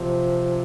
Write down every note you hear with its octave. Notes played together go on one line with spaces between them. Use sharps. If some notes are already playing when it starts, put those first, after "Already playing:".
Already playing: C3 F3